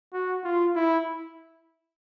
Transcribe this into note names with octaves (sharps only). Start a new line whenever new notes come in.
F#4
F4
E4